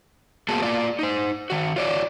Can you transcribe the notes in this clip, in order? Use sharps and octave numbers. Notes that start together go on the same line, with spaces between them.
A#3 B3 F#4 G#4 A5
A#3 F4 D5
D#4 C5
D#3 F#4
F4 C#5 D5